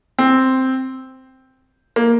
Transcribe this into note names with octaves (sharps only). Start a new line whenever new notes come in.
C4
A#3